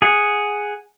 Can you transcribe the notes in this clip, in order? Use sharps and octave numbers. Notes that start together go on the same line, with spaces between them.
G#4 F#5